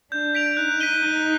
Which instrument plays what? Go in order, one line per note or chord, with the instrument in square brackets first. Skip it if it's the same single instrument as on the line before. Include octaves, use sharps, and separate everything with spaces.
[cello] D4 [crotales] G6
[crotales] B6 D7 F7
[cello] D#4 [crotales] F#6
[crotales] B6 D#7 G7
[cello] D#4 [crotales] F#6